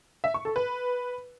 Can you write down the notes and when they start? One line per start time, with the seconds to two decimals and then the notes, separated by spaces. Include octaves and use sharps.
0.24 E5
0.34 C#6
0.45 A4
0.56 B4